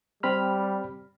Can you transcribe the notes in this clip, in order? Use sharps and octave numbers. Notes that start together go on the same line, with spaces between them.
G3 C4 B5 F6